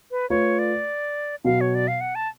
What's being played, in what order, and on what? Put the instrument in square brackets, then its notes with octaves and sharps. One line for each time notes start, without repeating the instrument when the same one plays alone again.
[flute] B4
[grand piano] A3 F4 B4 [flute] C#5
[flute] D5
[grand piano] B2 F#3 B3 F#4 [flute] F5
[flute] C#5
D5
F5
F#5
A5